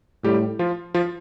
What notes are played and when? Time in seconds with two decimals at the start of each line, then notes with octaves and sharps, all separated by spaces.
0.24 A2 G3 G4
0.59 F3 F4
0.94 F3 F4